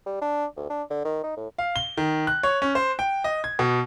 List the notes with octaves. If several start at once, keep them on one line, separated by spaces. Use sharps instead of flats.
G3
D4
D2
D4
D3
D#3
D#4
A2
F5
G7
D#3
F#6
C#5
C#4
C5
G5
D#5
G#6
B2